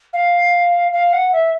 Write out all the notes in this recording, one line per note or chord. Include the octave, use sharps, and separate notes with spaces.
F5
F5
F#5
E5